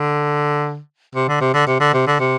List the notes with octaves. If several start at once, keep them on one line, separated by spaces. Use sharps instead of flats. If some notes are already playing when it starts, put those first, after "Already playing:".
Already playing: D3
C3
D3
C3
D3
C3
D3
C3
D3
C3